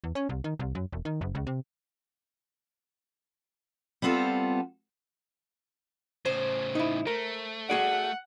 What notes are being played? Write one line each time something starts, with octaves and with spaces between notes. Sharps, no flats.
E2
C#4
C2
D#3
C2
F#2
E1
D#3
F#1
C#2
C3
G3 B3 C4 F4 A4
A2 C#3 C5
D#4 E4
A3 A#4
F#4 G#4 D5 F#5